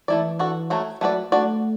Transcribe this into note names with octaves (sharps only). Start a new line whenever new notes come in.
E3 A3 E4 D5
D4 F#4 A4
F#3 A3 F#4
F#3 A3 F#4 B4 D5
A3 D4 F#4 D5